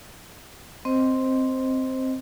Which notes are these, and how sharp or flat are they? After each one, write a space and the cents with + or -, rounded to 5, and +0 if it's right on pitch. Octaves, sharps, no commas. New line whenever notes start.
C4 +0 C5 +0 D#5 +0